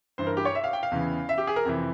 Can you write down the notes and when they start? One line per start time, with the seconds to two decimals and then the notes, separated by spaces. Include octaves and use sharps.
0.18 G2 E3 C5
0.27 A#4
0.37 G4
0.45 C#5
0.55 E5
0.64 F5
0.73 G5
0.83 F5
0.91 E2 C#3 E3
1.29 E5
1.38 G4
1.47 G#4
1.56 A#4
1.65 F2 C3 E3